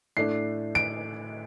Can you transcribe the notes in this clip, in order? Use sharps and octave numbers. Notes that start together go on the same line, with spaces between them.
A2 A3 D4 C7
D7